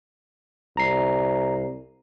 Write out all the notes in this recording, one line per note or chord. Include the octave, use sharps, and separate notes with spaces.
C2 A#5 C7